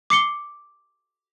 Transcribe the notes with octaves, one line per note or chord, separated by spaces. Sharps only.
D6 C7 C#7 G7